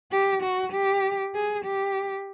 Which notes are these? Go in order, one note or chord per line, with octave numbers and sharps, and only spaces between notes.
G4
F#4
G4
G#4
G4